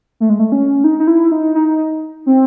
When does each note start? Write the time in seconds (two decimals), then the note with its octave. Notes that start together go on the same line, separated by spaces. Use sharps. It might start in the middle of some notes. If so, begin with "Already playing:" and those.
0.20 A3
0.30 G#3
0.39 A3
0.52 C#4
0.84 D#4
1.00 D#4
1.07 E4
1.32 D#4
1.55 D#4
2.26 C4